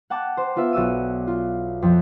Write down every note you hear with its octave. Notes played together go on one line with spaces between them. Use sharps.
F#5 G5 A5 D6
C5
B3 F4 B4 E5
B1 F#4 D5 E6 D#7
F4
F2 F3